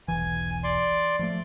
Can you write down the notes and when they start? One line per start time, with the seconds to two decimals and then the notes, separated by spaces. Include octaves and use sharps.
0.08 E1 B1 E3 G#5
0.64 D5 C6
1.19 F3 F#3 A3